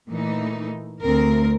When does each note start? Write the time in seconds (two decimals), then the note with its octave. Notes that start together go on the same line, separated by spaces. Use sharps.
0.10 A#2 E3 A3 D#4
1.01 D2 C4 A#4